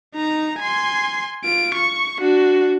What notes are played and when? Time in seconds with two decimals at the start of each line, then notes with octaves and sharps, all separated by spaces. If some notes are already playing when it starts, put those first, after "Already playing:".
0.15 D#4 A#5
0.60 G#5 C6
1.45 F4 D7
1.75 C#6
2.20 D4 F#4